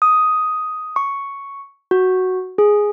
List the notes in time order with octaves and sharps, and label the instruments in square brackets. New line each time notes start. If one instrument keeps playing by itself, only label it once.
[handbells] D#6
C#6
F#4
G#4